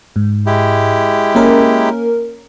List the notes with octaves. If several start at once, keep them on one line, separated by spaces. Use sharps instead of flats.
G#2
G#3 E4 G4
A#3 C#4 A#4